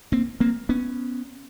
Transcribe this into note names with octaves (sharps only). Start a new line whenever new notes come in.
A#3 C4
A#3 C4
B3 C#4